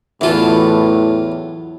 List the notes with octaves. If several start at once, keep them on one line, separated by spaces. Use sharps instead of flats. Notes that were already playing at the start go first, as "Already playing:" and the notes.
E2 A2 E3 F#3 F4 A4